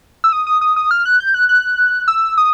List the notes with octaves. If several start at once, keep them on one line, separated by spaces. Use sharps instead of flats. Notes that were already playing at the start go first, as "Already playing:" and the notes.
E6
D#6
D#6
D#6
D#6
F6
F#6
G6
F#6
F#6
E6
D#6